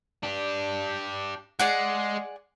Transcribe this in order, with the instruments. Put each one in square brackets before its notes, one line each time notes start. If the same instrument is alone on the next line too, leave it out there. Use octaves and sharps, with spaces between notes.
[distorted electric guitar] D4 G4
[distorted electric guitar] G#3 [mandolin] G#4 D5 F#5